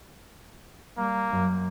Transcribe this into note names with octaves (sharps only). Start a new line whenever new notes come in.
G3 A#3
F#2